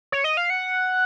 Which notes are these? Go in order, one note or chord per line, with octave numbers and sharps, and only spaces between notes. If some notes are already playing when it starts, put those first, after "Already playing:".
C#5
D#5
F5
F#5